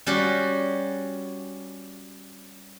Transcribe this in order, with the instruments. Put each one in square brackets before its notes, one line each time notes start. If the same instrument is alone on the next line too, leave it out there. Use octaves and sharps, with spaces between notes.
[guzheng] G3 C#4 F#4 G4